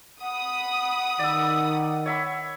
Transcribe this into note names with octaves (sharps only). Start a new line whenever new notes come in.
F#5 B5 D#6
D#3 D5 E6
C#5 E5 B5